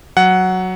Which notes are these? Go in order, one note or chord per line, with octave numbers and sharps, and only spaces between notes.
F#3 F#5